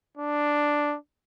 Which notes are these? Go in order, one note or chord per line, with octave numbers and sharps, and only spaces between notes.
D4